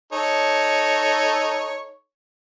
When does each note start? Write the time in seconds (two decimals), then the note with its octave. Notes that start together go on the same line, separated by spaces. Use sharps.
0.13 D#4 A4 C#5